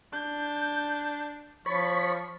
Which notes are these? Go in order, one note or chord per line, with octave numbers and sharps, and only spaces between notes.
D4 G6
F3 C#5 B5 C#6 A6